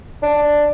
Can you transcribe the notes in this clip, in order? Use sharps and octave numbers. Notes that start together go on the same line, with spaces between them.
D4